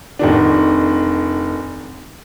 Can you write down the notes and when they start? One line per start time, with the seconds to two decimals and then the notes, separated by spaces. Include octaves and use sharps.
0.19 F1 D#3 D4